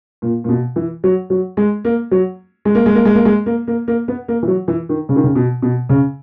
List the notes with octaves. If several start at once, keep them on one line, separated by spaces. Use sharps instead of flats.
A#2
A#2
B2
E3
F#3
F#3
G#3
A#3
F#3
G#3
A#3
G#3
A#3
G#3
A#3
G#3
A#3
A#3
A#3
B3
A#3
E3
F#3
E3
D#3
C#3
D#3
C#3
B2
B2
C#3